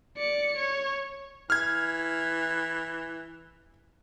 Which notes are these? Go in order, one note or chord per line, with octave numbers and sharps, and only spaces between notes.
D5 C#7
C#5
E3 F6 G#6